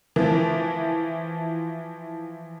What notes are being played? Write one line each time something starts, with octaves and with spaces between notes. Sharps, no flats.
E3 F3